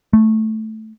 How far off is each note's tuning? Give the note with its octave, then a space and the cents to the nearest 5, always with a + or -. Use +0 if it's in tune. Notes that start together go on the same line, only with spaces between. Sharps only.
A3 -5